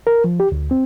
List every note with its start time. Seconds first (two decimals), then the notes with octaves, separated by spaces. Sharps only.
0.07 A#4
0.24 F3
0.40 G4
0.52 D2
0.71 C4